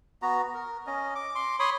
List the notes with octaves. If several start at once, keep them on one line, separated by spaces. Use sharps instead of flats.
B3 F#4 A#5
A#4
C#4 D#5
D6
C6 D6
C#5 B5 C6 D#6